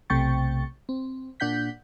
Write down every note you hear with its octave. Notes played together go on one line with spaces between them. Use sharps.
B1 C3 A3 G5 C#6 A6
C4
A#2 D4 F#5 G6 B6